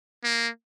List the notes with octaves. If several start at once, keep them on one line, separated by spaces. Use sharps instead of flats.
A#3